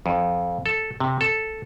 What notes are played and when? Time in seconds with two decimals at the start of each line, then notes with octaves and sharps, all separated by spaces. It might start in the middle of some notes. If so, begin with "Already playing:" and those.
0.06 F2
0.66 A4
1.00 C3
1.21 A4